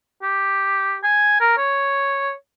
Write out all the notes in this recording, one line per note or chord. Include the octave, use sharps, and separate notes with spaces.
G4
G#5
A#4
C#5